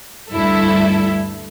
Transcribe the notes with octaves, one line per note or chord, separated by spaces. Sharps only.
D2 G2 E4 A4 E5